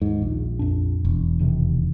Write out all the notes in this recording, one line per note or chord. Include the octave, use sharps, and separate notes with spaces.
D#2 G#2
A#1
F2 D4
E1
F1 C3 D#3